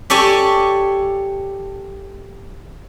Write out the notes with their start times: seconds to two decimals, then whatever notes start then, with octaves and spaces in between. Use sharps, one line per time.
0.10 G4 A4 C#5 D5 G#5